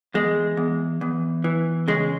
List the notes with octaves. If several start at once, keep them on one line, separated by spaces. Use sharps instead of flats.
E2 G#3
E2
E2
E3
C#3 G#3